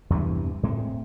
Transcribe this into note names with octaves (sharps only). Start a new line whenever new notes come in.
E2 G2 C3 E3
A2 G#3 A3 C4